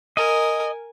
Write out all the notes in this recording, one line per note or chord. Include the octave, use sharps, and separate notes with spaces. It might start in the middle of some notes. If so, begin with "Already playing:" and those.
A#4 D#5 G#5